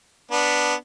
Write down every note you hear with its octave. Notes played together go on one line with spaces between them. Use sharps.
B3 D4